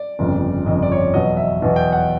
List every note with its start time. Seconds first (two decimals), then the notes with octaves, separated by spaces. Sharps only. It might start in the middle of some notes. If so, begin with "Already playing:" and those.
Already playing: D5
0.19 G1 F2 C#3
0.66 G1 F2 C#3 D#5
0.82 D5
0.92 C#5
0.98 D5
1.14 E2 B2 F#3 D#5
1.37 E5
1.61 E2 B2 F#3
1.76 G5
1.93 F#5